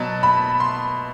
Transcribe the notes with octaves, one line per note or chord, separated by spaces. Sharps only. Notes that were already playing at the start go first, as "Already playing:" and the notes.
Already playing: B2 F#3 A5
B5
C6